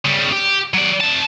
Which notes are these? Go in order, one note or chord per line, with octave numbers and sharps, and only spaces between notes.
C#3 G3
G4
F#3 D5
C3 A5